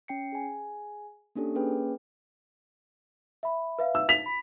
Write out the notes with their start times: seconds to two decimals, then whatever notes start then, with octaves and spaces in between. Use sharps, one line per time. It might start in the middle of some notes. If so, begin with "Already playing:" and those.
0.08 C#4 G5 C7 C#7
0.32 G#4 G#5
1.35 A#3 C#4 D4 G4 A4
1.55 A#3 C#4 G#4 B4 G5
3.43 E5 B5
3.79 B4 E5 F5
3.95 E6
4.09 B6 F7
4.26 B5